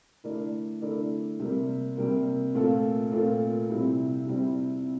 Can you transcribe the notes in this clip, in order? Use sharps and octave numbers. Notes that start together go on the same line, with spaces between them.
D3 A3 E4 A#4 D5
D3 A3 E4 A#4 D5
C3 G3 A#3
C3 G3 A#3
A#2 A3 C4 F4 A4
A#2 A3 C4 F4 A4
C3 G3 C4 E4
C3 G3 C4 E4